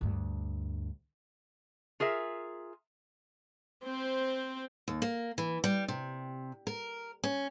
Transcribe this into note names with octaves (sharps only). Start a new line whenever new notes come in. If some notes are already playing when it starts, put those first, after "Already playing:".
D2 G2
F4 G#4 A#4 E5
C4 C5
D#2
A#3
E3
G3
C3
A#4
C#4